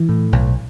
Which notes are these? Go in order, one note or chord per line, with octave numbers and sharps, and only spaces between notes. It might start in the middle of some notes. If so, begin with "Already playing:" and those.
Already playing: E3
A2
B1